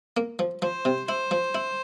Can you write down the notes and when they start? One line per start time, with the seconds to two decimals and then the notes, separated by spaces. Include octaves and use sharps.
0.17 A#3
0.39 F3
0.62 F3 C5
0.85 C3
1.08 E4 C5
1.31 F3
1.55 E4